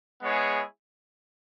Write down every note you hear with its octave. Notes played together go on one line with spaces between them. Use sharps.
G#3 B3 E4 G#4 C#5